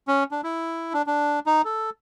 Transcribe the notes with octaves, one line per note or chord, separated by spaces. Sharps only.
C#4
D4
E4
D4
D4
D#4
A4